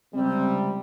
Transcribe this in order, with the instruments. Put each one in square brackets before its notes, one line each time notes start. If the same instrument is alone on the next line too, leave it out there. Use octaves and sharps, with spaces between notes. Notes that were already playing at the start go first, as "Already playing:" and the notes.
[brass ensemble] C#2 C3 G3 [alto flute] C4